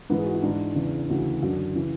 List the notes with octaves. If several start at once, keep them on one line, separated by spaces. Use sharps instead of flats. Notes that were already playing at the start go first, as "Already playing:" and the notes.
G#2 E3 B4
G#4
F#4
E4
G#2 D4
E3
E2 C#3 E3
D2 C#3 E3 F#4
F#2 D3
C#3 E3